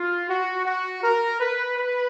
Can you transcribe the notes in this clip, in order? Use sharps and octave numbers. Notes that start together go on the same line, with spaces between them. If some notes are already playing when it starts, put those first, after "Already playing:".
Already playing: F4
F#4
F#4
A#4
B4
B4